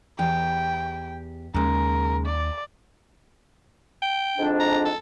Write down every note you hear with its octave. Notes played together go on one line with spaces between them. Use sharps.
E2 G4 G5
D#2 C#3 G#3 A#4
D5
G5
F2 G#2 D4
A#5
A4